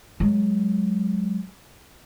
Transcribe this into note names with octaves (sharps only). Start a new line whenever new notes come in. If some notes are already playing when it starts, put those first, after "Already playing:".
F#3 G#3